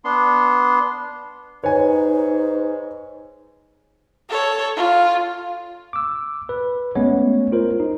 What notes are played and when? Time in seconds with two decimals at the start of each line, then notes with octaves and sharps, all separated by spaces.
0.05 B3 D4 C6
1.64 G#2 D#4 B4 C#5 G#5
4.30 A4 C#5
4.77 F4
5.93 D6 E6
6.49 B4
6.95 G#3 A3 B3 C#4 C#5
7.52 F4 A#4 C5
7.80 D#4